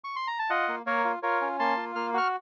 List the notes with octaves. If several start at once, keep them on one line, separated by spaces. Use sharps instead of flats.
C#6
C6
A#5
A5
F4 D#5 F#5
A#3
A#3 A#4 C#5
F4
F4 A#4 C#5
C#4
A#3 A5 C6
F4
A#3 F6
F#4 C#6 F6